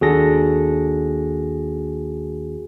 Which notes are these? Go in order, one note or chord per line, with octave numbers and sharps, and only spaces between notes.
D#2 D4 F#4 G#4 A4 A#6